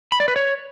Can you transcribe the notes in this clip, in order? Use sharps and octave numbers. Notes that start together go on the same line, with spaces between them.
B5
D5
B4
C#5